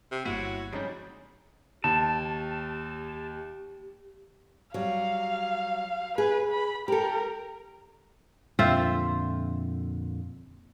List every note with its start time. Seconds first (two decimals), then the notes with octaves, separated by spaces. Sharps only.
0.12 C3
0.25 G1 A#3 E4 F#4 C#5
0.73 F2 C#3 G3 G#3 D#4
1.84 D#2 G4 A5
4.74 F#3 G3 F5
6.18 G#4 B4
6.51 B5
6.88 G4 A4 A#4
8.59 F2 A#2 D3 C4 F4 E5